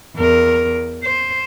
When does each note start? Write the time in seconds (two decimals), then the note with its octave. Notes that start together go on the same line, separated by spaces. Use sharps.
0.16 E2 A#4
1.03 C5